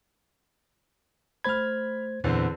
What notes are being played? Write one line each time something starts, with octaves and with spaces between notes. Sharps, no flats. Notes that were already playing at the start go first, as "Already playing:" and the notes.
A3 C5 B5 F6 G#6
E2 A#2 D3 C4